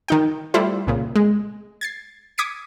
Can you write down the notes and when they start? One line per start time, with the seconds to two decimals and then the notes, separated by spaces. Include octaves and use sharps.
0.08 D#3 D#4 G5
0.54 G3 A3 E4 F4 C5
0.87 C2 A#2 C#3
1.16 G#3
1.81 G#6 A6 C7
2.38 D6 D#6 G#6 B6 C#7 D7